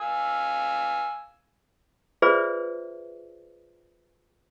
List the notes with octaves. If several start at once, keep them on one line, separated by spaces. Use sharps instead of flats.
F5 G#5 E6
F4 G#4 B4 C5 D5 E5